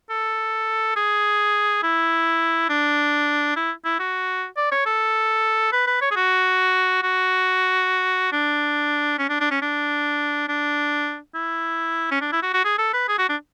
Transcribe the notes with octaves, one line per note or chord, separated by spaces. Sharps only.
A4
G#4
E4
D4
E4
E4
F#4
D5
C#5
A4
B4
B4
C#5
G#4
F#4
F#4
D4
C#4
D4
D4
C#4
D4
D4
E4
C#4
D4
E4
F#4
F#4
G#4
A4
B4
G#4
F#4
D4